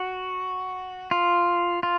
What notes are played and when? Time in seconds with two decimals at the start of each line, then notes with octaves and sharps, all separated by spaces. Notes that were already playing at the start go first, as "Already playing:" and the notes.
Already playing: F#4
1.11 F4
1.83 F4